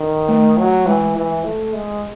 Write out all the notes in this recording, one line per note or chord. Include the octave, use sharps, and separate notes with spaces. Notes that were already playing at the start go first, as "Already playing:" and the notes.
Already playing: D#3
A3
F#3
E3 G#3
E3
A3
G#3